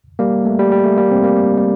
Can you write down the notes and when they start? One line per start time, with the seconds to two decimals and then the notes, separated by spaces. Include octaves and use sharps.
0.19 G3 A#3
0.45 A3
0.59 G3
0.72 G3
0.84 A3
0.97 G3 A#3
1.10 A3 C4
1.24 G3 A#3
1.37 G3
1.58 G3